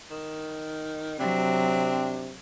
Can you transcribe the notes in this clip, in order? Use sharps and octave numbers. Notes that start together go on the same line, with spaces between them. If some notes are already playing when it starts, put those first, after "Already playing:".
D#3
C3 F#3 C4 D4